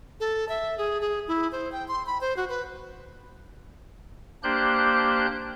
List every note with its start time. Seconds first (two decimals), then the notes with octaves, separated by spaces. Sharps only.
0.20 A4
0.49 E5
0.78 G#4
1.01 G#4
1.28 E4
1.52 C5
1.72 G5
1.88 C6
2.06 B5
2.21 C5
2.37 F#4
2.49 B4
4.43 A#3 D4 G4 C5 F#6 G6